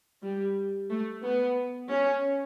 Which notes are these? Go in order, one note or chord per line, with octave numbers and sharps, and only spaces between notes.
G3
A3
B3
C#4